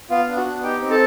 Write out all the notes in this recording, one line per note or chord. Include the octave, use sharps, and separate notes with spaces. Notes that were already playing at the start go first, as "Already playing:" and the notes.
B3 F4 F5
D4
F#4 F#5
B3
D#4 G4 G5
C4
A4 A5